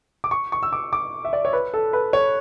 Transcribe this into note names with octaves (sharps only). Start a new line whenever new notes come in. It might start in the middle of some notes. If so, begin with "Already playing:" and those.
D6
C#6
C#6
E6
D6
D6
E5
D5
C#5
B4
A4
B4
C#5